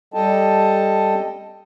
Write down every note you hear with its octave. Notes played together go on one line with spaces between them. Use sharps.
G3 A4 D#5 G5 A5